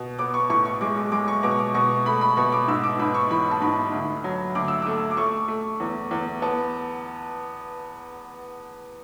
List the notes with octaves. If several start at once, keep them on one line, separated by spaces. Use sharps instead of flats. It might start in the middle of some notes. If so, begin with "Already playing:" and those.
Already playing: B2
B3 D6
C#6
A2 C#6
C#6
G#3 D6
D6
G#3 D6
C#6
B2 D6
C#6
D6
B2 C#6
A3 B5
B5
B2 C#6
D6
G#2 E6
D6
G#2 B5
C#6
E3 B5
A5
G#2 B5
D2
F#3
D2 D6
E6
A3 D6
D6
A3 C#6
A3
E2
E2
B3 A5